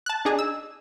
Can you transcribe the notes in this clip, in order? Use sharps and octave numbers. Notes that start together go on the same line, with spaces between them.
A5 F#6
D4 D#4 G#4
E6